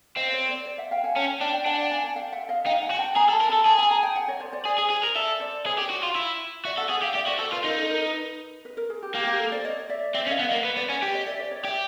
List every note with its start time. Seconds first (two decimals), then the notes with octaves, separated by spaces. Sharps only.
0.16 C4 D#5 F5
0.33 C#5 D#5
0.49 C5 D5
0.66 C5 D5
0.78 E5 F#5
0.91 F5 G5
1.04 F#5 G#5
1.16 C#4 G5 A5
1.41 D4 G5 A5
1.54 G5 A5
1.65 D4 F#5 G#5
1.78 F5 G5
1.91 F#5 G#5
2.04 F#5 G#5
2.16 F5 G5
2.32 E5 F#5
2.49 D#5 F5
2.66 D#4 F5 G5
2.82 F#5 G#5
2.90 F#4
2.99 G5 A5
3.15 G#4 G#5 A#5
3.29 A4
3.32 A5 B5
3.41 A#4
3.49 A4 A5 B5
3.65 G#4 A5 B5
3.78 G#5 A#5
3.91 G#5 A#5
4.03 G5 A5
4.16 F#5 G#5
4.28 C#5 D#5
4.40 C5 D5
4.53 C5 D5
4.66 G#4
4.78 G#4
4.90 G#4
5.04 A#4
5.15 A4 D5 E5
5.40 C5 D5
5.65 G#4 B4 C#5
5.78 G4
5.82 C5 D5
5.90 F#4
6.03 F4
6.15 E4
6.65 F#4 D5 E5
6.77 A4 E5 F#5
6.90 G#4 E5 F#5
7.02 G4 D#5 F5
7.15 G4 D5 E5
7.27 F#4 C5 D5
7.40 A4 C5
7.52 F4 B4
7.65 D#4 A#4
7.77 A4
7.90 A#4
8.02 B4
8.65 B4
8.77 A#4
8.90 G#4
9.03 G4
9.14 A#3 G4
9.27 G4
9.40 A4
9.52 C5 D5
9.65 C#5 D#5
9.89 D5 E5
10.14 C4 D5 E5
10.27 C#4
10.31 D#5 F5
10.40 B3
10.48 A#3 D#5 F5
10.64 B3
10.77 B3 C5 D5
10.89 C#4 B4 C#5
11.02 G4 C5 D5
11.14 C#5 D#5
11.27 D5 E5
11.39 C5 D5
11.51 C#5 D#5
11.64 G4 D5 E5